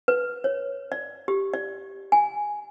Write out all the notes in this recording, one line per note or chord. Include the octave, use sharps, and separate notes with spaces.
B4
C#5
D5
G4
D5
G#5